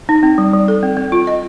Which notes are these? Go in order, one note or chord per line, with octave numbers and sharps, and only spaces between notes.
D#4
C4
G3
G3
A4
C4
C4
F4
D#5